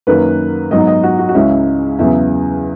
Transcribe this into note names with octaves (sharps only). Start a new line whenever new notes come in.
F#2 D#3 F#3 A#3 B4
G#2 F#3 B3 D#4 D#5
D#5
F#4
F#4
F#4
C#2 C#3 G#3 C#4 E4
E2 C#3 F#3 B3 E4